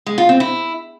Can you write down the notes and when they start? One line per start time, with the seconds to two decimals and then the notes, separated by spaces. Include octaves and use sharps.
0.06 G#3
0.18 F4
0.29 C4
0.40 E4